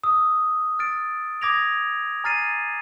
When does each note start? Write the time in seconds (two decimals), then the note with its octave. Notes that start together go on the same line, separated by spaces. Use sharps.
0.04 D#6 E6
0.79 F6 A6 D7
1.41 D6 D#6 G#6 A#6 D7 F7
2.24 G#5 A#5 F6 A6 C7 D#7